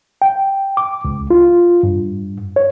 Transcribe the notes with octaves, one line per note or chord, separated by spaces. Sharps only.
G5
D6
C#2
F4
G2
C#5